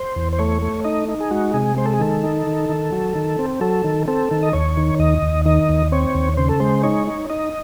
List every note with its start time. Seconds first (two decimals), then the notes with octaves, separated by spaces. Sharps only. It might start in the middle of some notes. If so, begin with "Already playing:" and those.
Already playing: C5
0.16 E2
0.33 C5
0.39 A3 C#5
0.62 A3
0.84 D#4 D#5
1.09 D#4
1.20 G#4
1.31 G#3 F#4
1.54 C3 G#4
1.77 G#3 C5
1.86 A4
1.93 G#4
2.00 D#3 A4
2.23 D#4
2.47 D#3
2.70 D#3
2.92 F#3
3.15 D#3
3.39 C4
3.61 F#3 A4
3.84 D#3
4.08 C4 A4
4.31 D#3
4.43 D#5
4.53 D#2 C#5
4.77 D#3
4.99 D#2 D#5
5.22 D#2
5.45 D#3 D#5
5.69 D#2
5.92 C4 C#5
6.15 D#2
6.37 C#3 C5
6.49 A4
6.60 G#3 C5
6.83 D#4 C#5
7.08 D#4
7.30 D#4 D#5